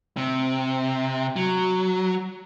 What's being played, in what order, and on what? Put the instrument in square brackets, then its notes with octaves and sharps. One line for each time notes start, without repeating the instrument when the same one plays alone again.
[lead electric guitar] C3
F#3